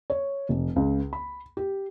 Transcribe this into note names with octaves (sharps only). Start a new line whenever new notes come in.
C#5
F1
C#2
B5
G4